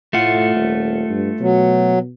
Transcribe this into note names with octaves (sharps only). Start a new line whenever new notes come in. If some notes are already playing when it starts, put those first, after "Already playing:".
A2 A3 F4 F#5
D#1
G2
B2 F#3